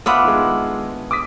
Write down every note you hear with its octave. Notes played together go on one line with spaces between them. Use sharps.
B3 D4 F4 E5 F#5 D#6
D#3 G#3
D6 D#6 B6